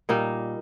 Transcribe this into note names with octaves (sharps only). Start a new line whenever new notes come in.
A#2 G3 D#4